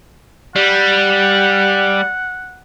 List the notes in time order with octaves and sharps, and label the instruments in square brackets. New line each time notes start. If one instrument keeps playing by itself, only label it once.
[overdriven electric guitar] G3 [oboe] F#5